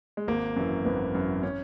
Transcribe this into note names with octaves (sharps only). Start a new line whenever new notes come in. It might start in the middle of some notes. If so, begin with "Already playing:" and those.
G#3
G#1 A#3
F#2 E3
G#1 B3
F#2 E3
C#4